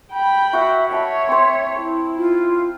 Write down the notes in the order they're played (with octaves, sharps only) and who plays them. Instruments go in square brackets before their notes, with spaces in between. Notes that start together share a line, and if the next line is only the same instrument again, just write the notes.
[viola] G5 B5
[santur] F#4 F#5 [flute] E5
[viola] C#5 [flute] E5 [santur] G5 A5 B5
[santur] C4 C5
[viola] E4
[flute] F4